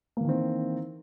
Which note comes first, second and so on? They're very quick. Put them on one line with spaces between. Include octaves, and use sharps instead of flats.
A#3 E3 D#3 C4